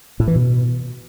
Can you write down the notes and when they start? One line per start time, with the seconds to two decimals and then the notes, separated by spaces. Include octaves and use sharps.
0.20 A2
0.28 E3
0.36 B2